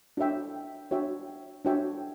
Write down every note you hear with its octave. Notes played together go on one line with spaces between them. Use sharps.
D4 F#4 C#5 E5 G5
D4 F#4 C#5 E5 G5
D4 F#4 C#5 E5 G5